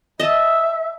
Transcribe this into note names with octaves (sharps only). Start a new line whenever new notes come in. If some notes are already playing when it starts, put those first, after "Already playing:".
D#5 E5 A5